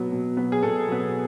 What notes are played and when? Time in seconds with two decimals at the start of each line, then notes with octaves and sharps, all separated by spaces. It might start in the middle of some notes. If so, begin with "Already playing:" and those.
Already playing: B2 F#3 B3
0.12 B2
0.37 F#3 B3
0.52 G#4
0.63 B2 A4
0.88 F#3 B3